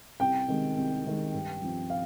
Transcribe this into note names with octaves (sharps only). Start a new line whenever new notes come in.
C2 G5
C3 D#3 G#3
C2
C3 D#3 G#3
G2
F3 C4
F5